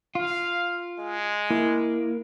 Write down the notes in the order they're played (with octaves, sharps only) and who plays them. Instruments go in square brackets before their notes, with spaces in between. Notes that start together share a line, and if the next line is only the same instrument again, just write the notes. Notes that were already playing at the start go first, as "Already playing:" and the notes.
[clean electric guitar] F4 [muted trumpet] F5
[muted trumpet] G#3
[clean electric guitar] A#3 [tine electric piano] E4